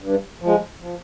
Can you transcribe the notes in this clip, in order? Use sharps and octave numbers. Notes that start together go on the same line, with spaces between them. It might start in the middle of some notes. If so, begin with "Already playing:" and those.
G2
F3
G#3
F3